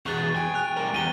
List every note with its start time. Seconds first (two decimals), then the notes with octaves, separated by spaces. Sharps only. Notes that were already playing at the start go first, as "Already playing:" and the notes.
0.06 E2 B2 G#4 C#6 F#6 A6
0.35 G5 G#5
0.54 F#6 F7
0.77 G3 A#4
0.94 E2 D#7 G7